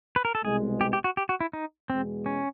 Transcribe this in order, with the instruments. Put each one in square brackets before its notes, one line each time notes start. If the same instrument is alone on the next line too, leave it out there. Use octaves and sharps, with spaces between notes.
[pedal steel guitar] B4
A#4
A4
[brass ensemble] C2 B2 G#3 [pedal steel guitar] G#4
[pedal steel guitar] G4
G4
F#4
G4
F#4
E4
D#4
[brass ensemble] E2 B2 G#3 [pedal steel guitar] C4
[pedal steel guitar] C#4